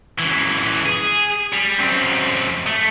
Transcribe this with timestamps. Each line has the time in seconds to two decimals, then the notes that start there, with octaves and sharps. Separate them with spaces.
0.19 F#2 E3
0.85 G#4
1.53 G3
1.78 F#2 C4
2.66 A3